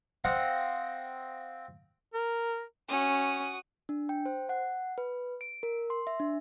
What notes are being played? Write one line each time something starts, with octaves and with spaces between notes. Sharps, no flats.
C4 D#5 F5 F#5
A#4
C#4 F#4 D#6
D4
G5
C5
F#5
B4
D7
A#4
C6
E5
D4